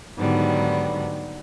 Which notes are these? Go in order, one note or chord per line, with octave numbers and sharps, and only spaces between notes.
G#2 D3 D#3 F#3 G3 B3